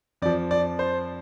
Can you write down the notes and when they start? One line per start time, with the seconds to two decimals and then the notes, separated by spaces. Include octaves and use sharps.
0.22 F2 F3 D5
0.51 D5
0.79 C5